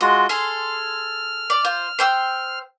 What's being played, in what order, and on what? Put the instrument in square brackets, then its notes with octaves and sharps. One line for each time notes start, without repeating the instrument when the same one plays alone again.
[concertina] G#3 F4 F#4 [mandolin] D#5
[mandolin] G#4 A4 C6 [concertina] F6
[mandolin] D5
F4 C5
C5 G5 E6